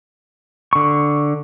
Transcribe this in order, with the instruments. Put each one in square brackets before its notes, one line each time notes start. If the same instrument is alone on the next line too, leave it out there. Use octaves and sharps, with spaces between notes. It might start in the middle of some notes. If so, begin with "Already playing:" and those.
[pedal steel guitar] D3 C#6